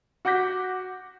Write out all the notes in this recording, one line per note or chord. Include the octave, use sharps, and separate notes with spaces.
F#4 F#5 D6 G6 A#6 B6